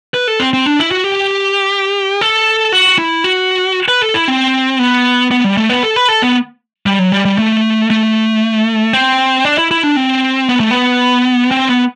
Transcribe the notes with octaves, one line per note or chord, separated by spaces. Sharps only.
B4
A4
C4
C4
D4
E4
F#4
G4
A4
F#4
E4
F#4
B4
A4
E4
C4
B3
B3
G3
A3
B3
A4
B4
A4
B3
G3
F#3
G3
G3
A3
A3
C4
D4
E4
E4
D4
C4
B3
A3
B3
C4
B3